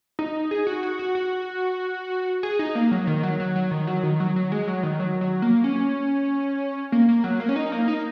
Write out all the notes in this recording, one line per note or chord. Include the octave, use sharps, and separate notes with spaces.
D#4
G#4
F#4
F#4
F#4
F#4
G#4
D#4
A#3
F#3
D#3
F#3
F#3
F#3
D#3
F#3
D#3
F#3
F#3
G#3
F#3
D#3
F#3
F#3
A#3
C#4
A#3
A#3
F#3
A#3
C#4
D#4
A#3
D#4